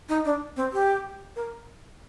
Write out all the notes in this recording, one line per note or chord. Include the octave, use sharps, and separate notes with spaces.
D#4
D4
C4
G4
A#4